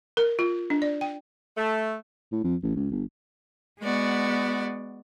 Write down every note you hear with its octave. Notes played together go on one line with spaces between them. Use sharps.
A#4
F4
D4
D5
G5
A3
A2
F2
A1
C#2
G1
G#3 B3 F#4 D5